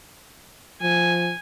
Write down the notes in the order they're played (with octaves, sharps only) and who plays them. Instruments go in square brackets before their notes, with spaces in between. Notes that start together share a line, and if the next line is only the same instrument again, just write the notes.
[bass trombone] F3 [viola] G#5